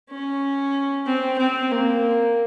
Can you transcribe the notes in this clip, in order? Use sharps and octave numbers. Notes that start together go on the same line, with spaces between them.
C#4
C4
C4
A#3